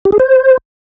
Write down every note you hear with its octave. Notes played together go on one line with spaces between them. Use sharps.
G4
G#4
C5